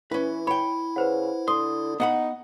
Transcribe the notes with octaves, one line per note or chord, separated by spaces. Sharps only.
E3 C#4 E4 B4
C#5 G5 B5
C#3 B4 C5 F#5
D3 C6 D#6
B3 D#4 F#5 B5